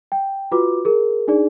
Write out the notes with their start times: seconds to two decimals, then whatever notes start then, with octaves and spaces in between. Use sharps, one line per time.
0.12 G5
0.52 F4 F#4 B4 D6
0.85 G#4 A#4
1.28 D4 D#4 G#4 D5